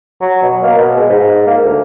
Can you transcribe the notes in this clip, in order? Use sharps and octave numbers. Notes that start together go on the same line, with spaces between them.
F#3
B2
A#3
B2
G#3
G#2
A#3
D2